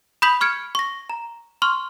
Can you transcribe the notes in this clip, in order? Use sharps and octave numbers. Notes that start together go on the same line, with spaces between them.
B5 D#6 G6 B6 F7 F#7
C#6 F6 G#6 C#7 D7
C#6 A#6
A#5
C6 C#6 F6